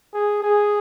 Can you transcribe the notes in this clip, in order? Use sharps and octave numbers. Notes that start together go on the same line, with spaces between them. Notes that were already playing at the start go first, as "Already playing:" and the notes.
G#4
G#4